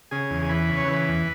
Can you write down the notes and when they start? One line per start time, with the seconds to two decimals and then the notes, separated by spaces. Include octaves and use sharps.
0.11 C#3 G#4
0.30 E2
0.42 G#4
0.49 E3 B4
0.69 C#3
0.77 C#5
0.88 E3 B4
1.08 E2